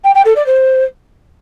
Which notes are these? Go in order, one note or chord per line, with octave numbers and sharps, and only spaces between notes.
G5
G5
A4
D5
C5